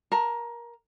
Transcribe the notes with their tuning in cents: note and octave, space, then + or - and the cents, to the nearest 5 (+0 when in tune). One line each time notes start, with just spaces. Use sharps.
A#4 +20 A5 +30